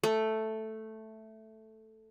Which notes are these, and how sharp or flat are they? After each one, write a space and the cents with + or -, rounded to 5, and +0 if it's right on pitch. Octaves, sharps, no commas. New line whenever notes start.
A3 +0